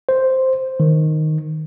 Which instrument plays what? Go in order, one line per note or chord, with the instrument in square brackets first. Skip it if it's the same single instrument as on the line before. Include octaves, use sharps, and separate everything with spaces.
[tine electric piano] C5
D#3